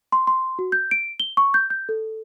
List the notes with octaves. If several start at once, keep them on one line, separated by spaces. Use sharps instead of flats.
C6
C6
F#4
G6
D7
G7
C#6
G6
G6
A4